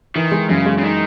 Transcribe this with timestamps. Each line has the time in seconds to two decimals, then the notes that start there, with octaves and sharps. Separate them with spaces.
0.16 D#3 E3
0.32 G#3
0.49 F#2 C#3
0.66 G#3
0.78 C#3
0.83 D#3